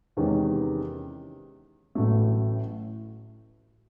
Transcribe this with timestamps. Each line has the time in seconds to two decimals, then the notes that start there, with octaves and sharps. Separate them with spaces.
0.17 E2 C3 D#3 G#3 C#4
1.95 A1 A2 F#3 A3